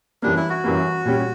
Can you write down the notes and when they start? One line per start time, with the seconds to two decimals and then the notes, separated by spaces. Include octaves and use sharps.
0.22 F#2 E3 G3 A#3 D4
0.37 E4
0.50 F#4
0.64 F#2 E3 G3 A#3
1.05 A#2 G3 C#4 G4